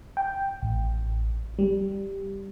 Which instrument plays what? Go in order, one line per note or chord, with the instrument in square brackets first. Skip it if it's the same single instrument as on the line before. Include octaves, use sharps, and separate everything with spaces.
[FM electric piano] G5
A1
G3